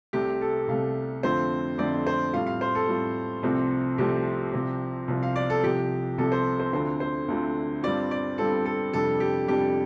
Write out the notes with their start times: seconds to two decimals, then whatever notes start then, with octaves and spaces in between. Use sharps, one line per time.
0.13 C2 C3 A3 G4
0.41 A4
0.68 C2 C3 A3 F5
1.23 F2 D3 A3 C4 F4 C5
1.78 F2 D3 A3 C4 F4 D5
2.07 C5
2.33 A2 G3 C4 F4 F5
2.47 F5
2.61 C5
2.75 A4
2.88 A2 G3 C4 F4
3.43 C2 C3 F3 A3 C4
3.98 C2 C3 F3 A3 C4 G4
4.53 C2 C3 F3 C4 F4
5.08 C2 C3 F3 C4 F4
5.23 F5
5.36 D5
5.50 A4
5.63 C2 C3 F3 G4
6.18 C2 C3 F3 A4
6.32 C5
6.59 C5
6.73 D2 D3 A3 C4 F4 C5
7.00 C5
7.28 D2 D3 A3 C4 F4
7.83 G2 G3 C4 F4 D5
8.11 D5
8.38 G2 G3 C4 F4 A4
8.66 A4
8.93 F2 C3 G3 D4 A4
9.20 G4
9.48 F2 C3 G3 D4 G4